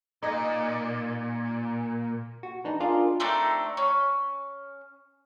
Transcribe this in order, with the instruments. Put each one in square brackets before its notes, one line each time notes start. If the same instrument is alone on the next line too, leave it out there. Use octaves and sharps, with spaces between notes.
[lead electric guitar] A#2 [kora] D#4 D#5
[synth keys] F#4
E3 D4 D#4
D4 F4 G#4 A#4 D5
[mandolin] A3 C4 D4 D#4
C#4